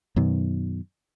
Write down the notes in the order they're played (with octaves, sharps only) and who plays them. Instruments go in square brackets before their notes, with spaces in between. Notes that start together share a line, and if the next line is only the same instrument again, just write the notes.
[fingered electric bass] F#2 B2 D#3